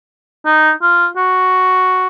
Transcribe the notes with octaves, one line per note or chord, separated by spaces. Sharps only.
D#4
F4
F#4